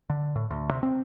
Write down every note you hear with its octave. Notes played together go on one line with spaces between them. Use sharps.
D3
A2
D2
C3
C4